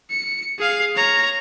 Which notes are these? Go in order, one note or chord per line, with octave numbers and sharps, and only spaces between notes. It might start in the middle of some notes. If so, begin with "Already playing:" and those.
C#7
G#4 F5
C#5 A#5